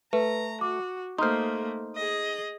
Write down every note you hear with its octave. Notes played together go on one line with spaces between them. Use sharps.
A3 B4 A#5
F#4 D6
A3 A#3 D#4 C5 C6 D#6 F6
G#4 D#5